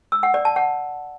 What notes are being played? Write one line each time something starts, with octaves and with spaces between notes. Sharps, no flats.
E6
F#5
D5
A5
F#5